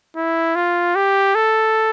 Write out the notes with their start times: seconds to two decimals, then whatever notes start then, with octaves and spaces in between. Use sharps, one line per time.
0.16 E4
0.55 F4
0.95 G4
1.35 A4